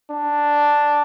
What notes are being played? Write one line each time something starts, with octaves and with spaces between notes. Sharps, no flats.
D4